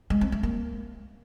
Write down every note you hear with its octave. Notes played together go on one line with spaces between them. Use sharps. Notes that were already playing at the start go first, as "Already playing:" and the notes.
G#3
C4
A3
A#3